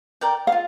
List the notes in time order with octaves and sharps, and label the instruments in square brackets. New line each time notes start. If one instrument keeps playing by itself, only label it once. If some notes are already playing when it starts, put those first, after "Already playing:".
[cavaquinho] A#4 D5 G5
[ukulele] F5
[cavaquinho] F4